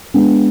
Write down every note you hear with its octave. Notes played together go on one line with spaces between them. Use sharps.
G#3 B3 D4